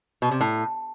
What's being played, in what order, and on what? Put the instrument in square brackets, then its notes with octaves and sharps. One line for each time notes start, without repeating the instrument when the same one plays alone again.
[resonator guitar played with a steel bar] B2
C3
A2